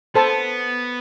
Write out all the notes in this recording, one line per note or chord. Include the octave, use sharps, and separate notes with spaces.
B3 A4 C5 A5